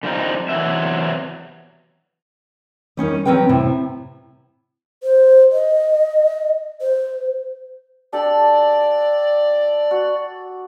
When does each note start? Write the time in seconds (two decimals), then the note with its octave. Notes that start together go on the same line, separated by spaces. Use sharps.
0.03 D3 F3 G3 C4 D#4
0.49 E2 C3 E3 F#3 E5
2.97 G3 C#4 D#4 A#4
3.25 F#3 C4 C#4 B4 G5
3.49 A2 C3 E4
5.03 C5
5.52 D#5
6.81 C5
8.13 D4 G4 A4 D5
9.91 F#4